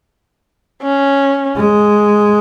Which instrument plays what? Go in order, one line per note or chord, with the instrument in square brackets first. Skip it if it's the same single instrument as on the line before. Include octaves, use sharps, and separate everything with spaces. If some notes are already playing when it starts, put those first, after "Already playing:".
[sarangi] C#4
[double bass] G#3